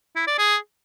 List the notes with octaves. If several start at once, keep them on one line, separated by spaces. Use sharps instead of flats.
E4
D5
G#4